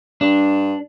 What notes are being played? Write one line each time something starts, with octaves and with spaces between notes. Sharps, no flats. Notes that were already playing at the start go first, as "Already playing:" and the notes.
G2 D4